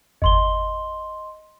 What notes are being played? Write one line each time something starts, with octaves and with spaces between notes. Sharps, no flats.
G1 E2 D#5 C6 G7